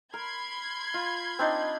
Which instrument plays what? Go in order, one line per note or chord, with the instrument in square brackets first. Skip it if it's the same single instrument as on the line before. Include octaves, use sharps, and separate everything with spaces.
[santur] A#4 [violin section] B5 C6 G#6
[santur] F4
C4 D4 D#4